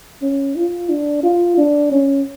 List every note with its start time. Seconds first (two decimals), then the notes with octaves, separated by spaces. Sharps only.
0.22 C#4
0.56 F4
0.89 D4
1.23 F4
1.57 D4
1.91 C#4